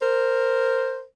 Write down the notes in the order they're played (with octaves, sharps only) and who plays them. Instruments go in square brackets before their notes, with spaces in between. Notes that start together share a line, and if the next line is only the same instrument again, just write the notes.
[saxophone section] A#4 C5